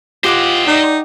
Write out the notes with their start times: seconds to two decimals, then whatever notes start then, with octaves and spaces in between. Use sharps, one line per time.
0.24 F4 G4 C5 D#5 F#5 D6
0.67 D#4 D5